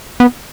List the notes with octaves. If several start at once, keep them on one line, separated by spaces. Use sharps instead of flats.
B3